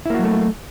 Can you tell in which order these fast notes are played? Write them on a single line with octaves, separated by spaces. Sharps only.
E4 A#3 F#4 F#3 A3